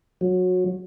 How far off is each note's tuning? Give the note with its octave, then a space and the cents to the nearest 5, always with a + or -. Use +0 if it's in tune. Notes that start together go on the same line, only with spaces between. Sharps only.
F#3 -20